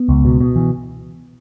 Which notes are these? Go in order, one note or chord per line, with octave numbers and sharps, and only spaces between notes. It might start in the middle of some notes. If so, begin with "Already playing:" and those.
Already playing: B3
C#2
B2
B2
E3